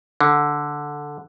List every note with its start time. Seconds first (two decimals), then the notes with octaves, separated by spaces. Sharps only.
0.21 D3